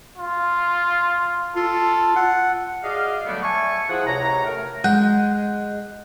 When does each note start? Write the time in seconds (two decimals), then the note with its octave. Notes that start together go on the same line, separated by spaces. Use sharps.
0.18 F4
1.56 F4 A4
2.16 F#5
2.83 F#4 G#4 D5 D#5 F5
3.26 D3 F#3 G3 A3 B3 D4
3.43 E5 G#5 A5 C#6
3.89 F3 E4 G#4 F#5
4.06 C#2 C3 C#5 A#5
4.46 A3 A#4
4.84 G#3 F#5 F#6 G6